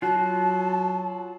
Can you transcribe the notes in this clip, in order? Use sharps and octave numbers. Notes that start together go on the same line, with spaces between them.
F#3 F4 F#4 A5